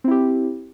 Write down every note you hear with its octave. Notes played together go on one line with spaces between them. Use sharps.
C4 E4 G4